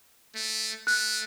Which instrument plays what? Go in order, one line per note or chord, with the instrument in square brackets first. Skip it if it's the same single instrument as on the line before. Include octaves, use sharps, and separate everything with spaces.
[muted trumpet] A3
[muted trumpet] A3 [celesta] F#6